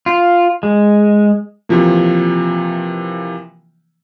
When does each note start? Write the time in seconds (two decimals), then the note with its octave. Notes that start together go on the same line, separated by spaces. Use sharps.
0.06 F4
0.63 G#3
1.69 C3 E3 F3 A#3